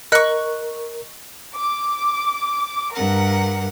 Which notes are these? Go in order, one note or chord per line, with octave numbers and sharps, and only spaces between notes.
A#4 D#5 C#6 F#6 C#7
D6
G2 A#4 F#5